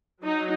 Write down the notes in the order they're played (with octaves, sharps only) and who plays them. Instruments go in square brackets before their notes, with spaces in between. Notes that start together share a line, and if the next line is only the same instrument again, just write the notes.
[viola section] F#3 D#4